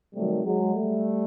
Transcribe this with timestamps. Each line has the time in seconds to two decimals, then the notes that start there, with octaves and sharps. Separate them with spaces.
0.15 C3 D#3 F#3 G3 A3
0.44 F#3 G#3
0.74 G3 A3